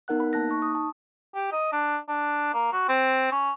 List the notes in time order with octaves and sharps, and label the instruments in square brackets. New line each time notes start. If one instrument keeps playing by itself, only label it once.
[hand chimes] B3 D#4 A#4 F#5 F#6
B5
A#3 A5 F#6 A#6
D#4 C#6
D#6
A5
[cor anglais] G4
D#5
D4
D4
A#3
F#4
C4
C#4